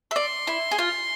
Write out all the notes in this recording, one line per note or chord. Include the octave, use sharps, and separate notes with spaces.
E5
D5 C6
E4
G#4
F4